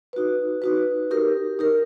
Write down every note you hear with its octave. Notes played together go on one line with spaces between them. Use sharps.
D#4 F#4 B4
D#4 F#4 B4
D#4 G4 A#4
D#4 G4 A#4